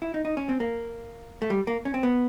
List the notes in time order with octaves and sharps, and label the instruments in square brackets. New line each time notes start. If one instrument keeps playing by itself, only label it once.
[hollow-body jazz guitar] E4
D#4
D#4
C#4
C4
A#3
A3
G3
A#3
C#4
C4
B3